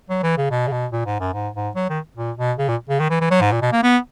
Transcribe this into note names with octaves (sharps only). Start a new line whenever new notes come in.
F#3
E3
C#3
B2
C#3
B2
A#2
G#2
F#2
G#2
G#2
F#3
D#3
A#2
B2
C#3
A#2
C#3
D#3
E3
E3
F#3
G#2
A#2
B2
A#3
B3